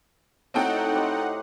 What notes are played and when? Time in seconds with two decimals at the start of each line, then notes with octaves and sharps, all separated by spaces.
0.54 A2 C4 D#4 F#4 A4 F#5 G5
0.91 G4 C5 B5